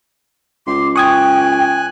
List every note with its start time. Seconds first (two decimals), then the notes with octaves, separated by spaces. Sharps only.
0.67 C#2 C6 D6
0.96 G5 G#5 C#6 D#6 F#6 G#6